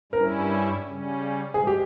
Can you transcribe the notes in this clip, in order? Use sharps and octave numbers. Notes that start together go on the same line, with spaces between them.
G2 G3 C#4 E4 A#4
C#3 G3 C#4
G#3 G#4
G4